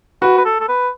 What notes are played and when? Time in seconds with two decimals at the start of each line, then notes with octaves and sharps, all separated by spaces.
0.22 F#4 B4
0.38 B4
0.45 A4
0.60 A4
0.68 B4